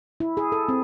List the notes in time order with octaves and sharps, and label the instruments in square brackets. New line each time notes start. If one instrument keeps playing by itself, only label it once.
[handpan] E4
G#4
A4
C4